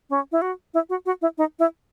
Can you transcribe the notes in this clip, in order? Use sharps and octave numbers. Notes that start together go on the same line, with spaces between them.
C#4
E4
F#4
E4
F#4
F#4
E4
D#4
E4